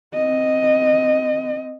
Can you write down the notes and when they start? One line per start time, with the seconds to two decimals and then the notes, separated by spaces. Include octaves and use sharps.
0.14 C4 D#5